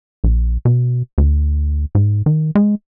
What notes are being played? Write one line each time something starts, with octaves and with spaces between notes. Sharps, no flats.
A#1
B2
D2
G#2
D#3
G#3